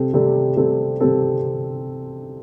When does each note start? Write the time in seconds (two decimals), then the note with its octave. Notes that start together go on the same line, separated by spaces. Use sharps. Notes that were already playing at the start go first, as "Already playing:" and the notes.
Already playing: C3 G3 C4 A4
0.14 C3 G3 C4 A4
0.57 C3 G3 C4 A4
1.00 C3 G3 C4 A4